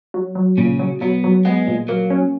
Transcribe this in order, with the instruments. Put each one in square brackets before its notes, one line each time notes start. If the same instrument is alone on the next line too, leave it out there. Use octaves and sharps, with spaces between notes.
[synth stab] F#3
F#3
[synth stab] A#2 [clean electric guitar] C#3 C#4
[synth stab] F#3
[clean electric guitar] B2 B3 [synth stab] F#3
[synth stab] F#3
[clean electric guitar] G#3 [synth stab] B3
[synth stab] A#2
[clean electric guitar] F#3 [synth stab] A#3
[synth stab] C#4